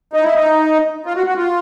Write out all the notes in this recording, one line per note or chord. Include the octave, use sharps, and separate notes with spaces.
D#4
E4
D#4
F4
F#4
F#4
F4